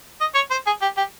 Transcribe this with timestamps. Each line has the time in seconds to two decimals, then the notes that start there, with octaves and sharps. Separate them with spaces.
0.20 D#5
0.35 C#5
0.51 C5
0.66 G#4
0.82 G4
0.97 G4